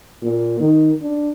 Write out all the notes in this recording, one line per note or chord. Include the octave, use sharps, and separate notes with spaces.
A#2
D#3
D4